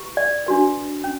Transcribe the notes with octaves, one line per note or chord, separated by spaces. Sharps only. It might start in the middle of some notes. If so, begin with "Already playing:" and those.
Already playing: E4 G4 B4
D5
D4 F#4 B4
C#4